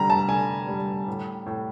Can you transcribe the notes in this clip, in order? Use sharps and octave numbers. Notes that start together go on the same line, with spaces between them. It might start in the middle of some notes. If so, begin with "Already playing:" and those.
Already playing: D3 G3 A#5
A5
D3 G#5
G3
A2
A2